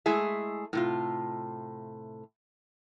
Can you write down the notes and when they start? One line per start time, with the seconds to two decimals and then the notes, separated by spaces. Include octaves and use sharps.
0.06 G#3 A3 E4 G#4 E5
0.73 A2 C3 F4